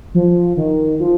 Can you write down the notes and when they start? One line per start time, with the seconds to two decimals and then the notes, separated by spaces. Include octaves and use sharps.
0.15 F3
0.57 D#3
1.00 F3